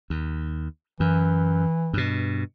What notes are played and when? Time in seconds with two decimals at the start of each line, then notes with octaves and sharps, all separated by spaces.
0.10 D#2
1.00 F#2 E3
1.93 G2 B2